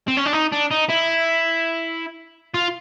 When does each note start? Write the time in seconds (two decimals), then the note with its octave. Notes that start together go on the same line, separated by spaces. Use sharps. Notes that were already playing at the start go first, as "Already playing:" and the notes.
0.08 C4
0.17 C#4
0.26 D4
0.33 D#4
0.52 D4
0.71 D#4
0.89 E4
2.54 F4